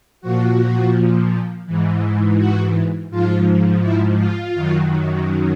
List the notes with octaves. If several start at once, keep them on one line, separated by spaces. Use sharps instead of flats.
A#2 F3 F#4
G#2 E3
F#4
G#2 F3 F4
E4
F4
F#2 D#3 F#3